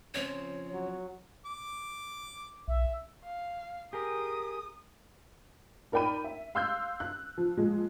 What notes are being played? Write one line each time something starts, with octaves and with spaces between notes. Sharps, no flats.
C#3 F3 C4 C#5
F#3
D6
B1 E5
F5
G4 G#4 A#4 D#6
D#4 A#4 D5 G5 B5 D#7
E5
F5 C6 E6 F#6 G6
F#6
F3
A#2 F3 G#3